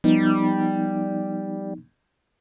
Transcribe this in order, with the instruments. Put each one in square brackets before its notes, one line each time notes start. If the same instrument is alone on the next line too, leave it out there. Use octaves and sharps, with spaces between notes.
[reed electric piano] F3 B3 D#4 [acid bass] G3